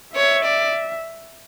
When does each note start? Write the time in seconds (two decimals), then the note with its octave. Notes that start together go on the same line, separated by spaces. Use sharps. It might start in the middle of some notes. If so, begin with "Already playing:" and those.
0.16 C#5 E5
0.45 D5